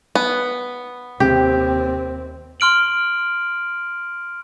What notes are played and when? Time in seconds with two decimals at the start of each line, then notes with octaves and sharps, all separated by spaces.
0.15 B3
1.20 D#2 C3 C4 G4
2.60 C6 F6 D7 F#7